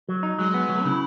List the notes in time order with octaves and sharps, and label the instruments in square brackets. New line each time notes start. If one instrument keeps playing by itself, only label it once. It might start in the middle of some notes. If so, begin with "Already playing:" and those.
[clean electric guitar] F#3
D#4
[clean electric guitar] F#3 [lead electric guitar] G#3
[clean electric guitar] B3
F#3
[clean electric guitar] C#3 [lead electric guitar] E4